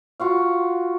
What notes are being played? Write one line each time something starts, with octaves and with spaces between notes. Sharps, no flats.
F4 F#4 F5